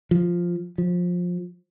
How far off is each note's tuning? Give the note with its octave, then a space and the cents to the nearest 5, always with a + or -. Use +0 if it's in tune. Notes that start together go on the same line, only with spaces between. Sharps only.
F3 +0
F3 +20